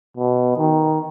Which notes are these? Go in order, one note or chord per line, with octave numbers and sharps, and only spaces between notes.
B2
D#3